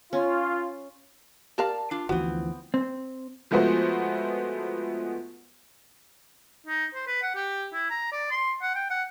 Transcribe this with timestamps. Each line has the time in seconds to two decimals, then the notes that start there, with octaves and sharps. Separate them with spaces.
0.13 C#4 F4
1.58 G4 A#4 D5 F5 A5
1.91 D4 F4
2.09 D2 E3 F3 B3 C4 F#4
2.74 C4
3.51 F3 G#3 A3 B3 F#4 C5
6.66 D#4
6.95 C5
7.07 B4
7.22 F#5
7.35 G4
7.73 E4
7.90 A#5
8.12 D5
8.31 C6
8.62 F#5
8.75 G5
8.90 F#5